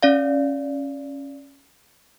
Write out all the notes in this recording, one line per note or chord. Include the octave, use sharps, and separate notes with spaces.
C#4 D5 F5